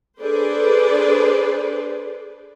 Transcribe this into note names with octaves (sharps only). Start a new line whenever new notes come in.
D4 G#4 A4 B4 C5 D5